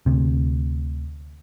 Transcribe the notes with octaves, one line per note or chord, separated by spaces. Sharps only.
D2 C3